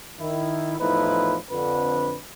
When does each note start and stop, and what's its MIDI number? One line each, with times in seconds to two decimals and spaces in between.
0.20 0.77 51
0.20 0.77 64
0.79 1.37 40
0.79 1.37 45
0.79 1.37 53
0.79 1.37 63
0.79 1.37 64
0.79 1.37 71
1.51 2.16 41
1.51 2.16 50
1.51 2.16 71